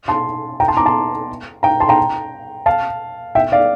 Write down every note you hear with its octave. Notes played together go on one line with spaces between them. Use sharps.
A5 C6
G5 A#5
A5 C6
A#5 D6
A5 C6
G5 A#5
A5 C6
G5 A#5
F5 A5
E5 G5
D5 F5